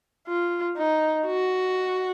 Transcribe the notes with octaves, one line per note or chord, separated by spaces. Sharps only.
F4
D#4
F#4